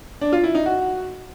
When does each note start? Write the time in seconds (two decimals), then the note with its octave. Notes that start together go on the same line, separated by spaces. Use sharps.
0.21 D4
0.32 F4
0.44 E4
0.55 D#4
0.66 F#4